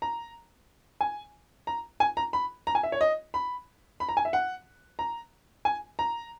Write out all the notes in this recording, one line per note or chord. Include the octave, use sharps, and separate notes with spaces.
A#5
G#5
A#5
G#5
A#5
B5
A#5
G#5
E5
C#5
D#5
B5
B5
A#5
G#5
E5
F#5
A#5
G#5
A#5